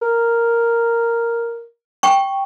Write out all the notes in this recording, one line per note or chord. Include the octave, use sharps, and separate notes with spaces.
A#4
G5 C#6